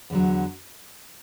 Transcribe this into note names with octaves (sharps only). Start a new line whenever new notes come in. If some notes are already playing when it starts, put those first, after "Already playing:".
E2 D3 F#3